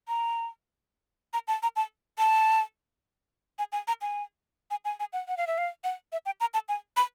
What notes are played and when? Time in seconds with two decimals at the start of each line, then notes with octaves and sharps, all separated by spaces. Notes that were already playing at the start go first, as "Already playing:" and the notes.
0.08 A#5
1.33 A#5
1.48 A5
1.63 A#5
1.76 A5
2.18 A5
3.59 G#5
3.72 G#5
3.88 A#5
4.02 G#5
4.71 G#5
4.85 G#5
5.00 G#5
5.13 F#5
5.28 F#5
5.37 F5
5.47 E5
5.58 F5
5.84 F#5
6.12 E5
6.26 G5
6.40 A#5
6.54 A5
6.69 G#5
6.97 B5